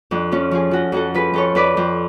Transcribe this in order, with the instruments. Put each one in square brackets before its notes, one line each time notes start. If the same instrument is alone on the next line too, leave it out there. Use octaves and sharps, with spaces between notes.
[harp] F2 D4
F3 C#4 F4
F3 F4 G#4
F3 F#4 A4
F2 F#4 A4
F3 G#4 B4
F2 A4 C#5
F2 B4 D5
F2